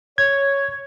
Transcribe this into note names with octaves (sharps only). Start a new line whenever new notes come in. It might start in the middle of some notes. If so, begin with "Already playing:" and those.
C#5 G#6